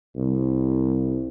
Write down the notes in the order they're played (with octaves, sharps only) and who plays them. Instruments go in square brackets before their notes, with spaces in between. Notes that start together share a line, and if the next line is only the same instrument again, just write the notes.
[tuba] C2